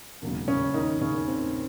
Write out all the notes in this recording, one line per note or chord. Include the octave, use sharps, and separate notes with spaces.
E1 D#2 C#3 F#3
C#3 C#4
D#3 D#4
C#3 C#4
C4